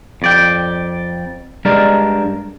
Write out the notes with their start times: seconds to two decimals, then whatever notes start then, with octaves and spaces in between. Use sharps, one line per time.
0.22 F2 D5 G5
1.65 G2 G#3 D4 A#4 A5